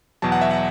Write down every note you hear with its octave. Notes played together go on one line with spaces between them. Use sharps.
E2 B2 F#3 A5
F#5
E5
F#5